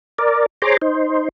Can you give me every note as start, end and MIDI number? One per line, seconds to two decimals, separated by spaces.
0.18 0.46 70
0.18 0.46 74
0.62 0.77 68
0.62 0.77 72
0.62 0.77 73
0.62 0.77 82
0.62 0.77 84
0.62 0.77 86
0.82 1.29 63
0.82 1.29 72